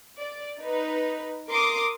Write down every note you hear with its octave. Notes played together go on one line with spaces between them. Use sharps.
D5
D#4 B4
A#4 C6 D6 D#6